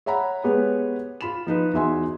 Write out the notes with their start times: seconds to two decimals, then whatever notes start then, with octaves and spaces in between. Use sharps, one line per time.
0.06 C#5 E5 F#5 A#5 B5
0.44 G#3 B3 G4 B4 C#5
1.21 F4 B5 E7
1.47 F3 D#4 B4
1.73 E2 D#4 F#4 E5 G#5 C6